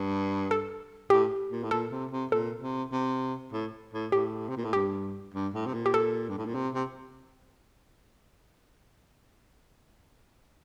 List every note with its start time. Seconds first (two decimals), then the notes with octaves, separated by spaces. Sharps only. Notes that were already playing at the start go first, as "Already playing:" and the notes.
Already playing: G2
0.51 A4
1.10 A2 G4
1.51 A#2
1.63 A2
1.71 A#2 A4
1.91 C3
2.11 C3
2.31 A#2 A4
2.62 C3
2.92 C3
3.52 A2
3.93 A2
4.12 A2 G4
4.48 C3
4.57 A#2
4.64 A2
4.73 G2 G4
5.34 G2
5.54 A2
5.66 C3
5.74 A#2
5.86 G4
5.94 A4
6.29 G2
6.37 A2
6.45 A#2
6.54 C3
6.74 C3